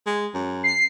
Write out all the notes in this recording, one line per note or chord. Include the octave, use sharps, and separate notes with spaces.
G#3
F#2
C7